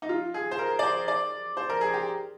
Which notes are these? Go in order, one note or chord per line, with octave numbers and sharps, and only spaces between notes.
D#4
F4
G#4
C5
A#4
D5
C5
D5
C5
A#4
G#4
G4